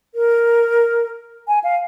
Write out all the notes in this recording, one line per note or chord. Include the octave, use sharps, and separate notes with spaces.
A#4
G#5
F5